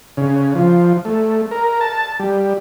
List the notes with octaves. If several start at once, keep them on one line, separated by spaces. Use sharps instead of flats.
C#3
F3
A3
A#4
A5
G3